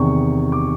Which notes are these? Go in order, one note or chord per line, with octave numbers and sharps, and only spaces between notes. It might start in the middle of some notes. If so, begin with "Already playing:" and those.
Already playing: E2 C3 D#3 C#6
D6